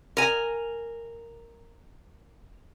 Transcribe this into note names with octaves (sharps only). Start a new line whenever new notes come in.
A#4 G#5